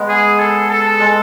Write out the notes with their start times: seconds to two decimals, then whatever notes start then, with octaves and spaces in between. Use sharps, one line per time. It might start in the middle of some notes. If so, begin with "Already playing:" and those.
Already playing: G#3 B3
0.08 G#4
0.39 A4
0.70 A4
1.00 G#3